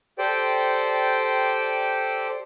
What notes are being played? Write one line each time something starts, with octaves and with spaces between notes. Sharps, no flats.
G4 A4 C5 D5 G5